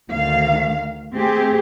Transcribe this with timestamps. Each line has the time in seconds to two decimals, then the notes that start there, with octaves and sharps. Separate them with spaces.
0.11 D2 D#3 F5
1.14 A3 C4 G4 G#4